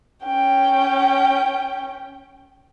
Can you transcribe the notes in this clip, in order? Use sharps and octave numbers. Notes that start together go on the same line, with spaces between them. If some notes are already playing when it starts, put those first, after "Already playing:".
C#4 G5